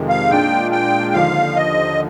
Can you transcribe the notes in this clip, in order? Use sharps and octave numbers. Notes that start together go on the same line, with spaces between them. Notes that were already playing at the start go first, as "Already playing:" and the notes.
Already playing: F2 C3 D#3 G#3
F5
A#2 G#3 D4 F4 G5
G5
D#2 D3 F3 F5
D#5